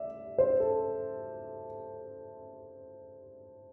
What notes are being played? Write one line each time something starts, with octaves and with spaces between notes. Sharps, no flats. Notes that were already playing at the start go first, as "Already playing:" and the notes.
Already playing: D5 E5
C5
A4